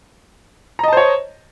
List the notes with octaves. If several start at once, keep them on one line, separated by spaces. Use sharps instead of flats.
C5 C#5 D#5 A5 A#5